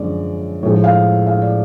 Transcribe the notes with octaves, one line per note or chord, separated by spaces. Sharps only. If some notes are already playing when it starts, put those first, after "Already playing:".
Already playing: F#2 D3 F3 G#3 D5
A2 F3 G#3
F5
F5
D5